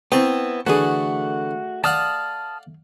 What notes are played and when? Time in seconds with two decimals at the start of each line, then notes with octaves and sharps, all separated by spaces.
0.12 B3 C4 E4 G5 A5 C#6
0.67 D3 E3 A3 F#4 G#4
1.84 D5 F5 F#5 A5 D#6 F6